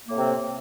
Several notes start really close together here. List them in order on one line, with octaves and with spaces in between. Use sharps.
A#3 A2 C4 C3